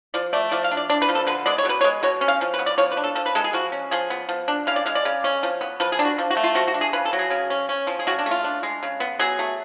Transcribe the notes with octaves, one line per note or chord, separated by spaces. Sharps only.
F3 D5
A3 D5
F3 D5
F5
D4
D5
D4 D5
B4
F3
A4
D3 B4
G#3 D5
C#5
B2 B4
C#5
G#3
B2 C#5
C#4
F5
F3
B4
B3
D5
F3 C#5
B4
D4
A4
F3 A4
B4
G#3 A4
G#4
F3 F#4
C#4
F3 G#4
B3
F3
D4
C#3 F5
D5
G#3 F5
D5
C#3
C#4
F3
B3
F3 B4
G#4
D4
F#4
F3
F#4
A3
F4
F3 F#4
F#4
D4
G#4
C#3 B4
A4
F#3
G#4
C#3
C#4
C#4
F3
G#4
C#3 F#4
D4
A3
F4
D4
G#3
C#3
B3
F#3 G#4
A3